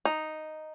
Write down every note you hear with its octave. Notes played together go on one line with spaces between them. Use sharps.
D#4